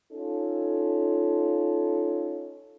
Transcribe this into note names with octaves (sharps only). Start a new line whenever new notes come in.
C#4 D#4 F4 A4